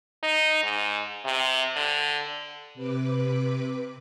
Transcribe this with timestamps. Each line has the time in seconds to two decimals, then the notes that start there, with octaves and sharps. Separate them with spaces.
0.23 D#4
0.63 G#2
1.25 C3
1.76 D3
2.74 C3 B4 D6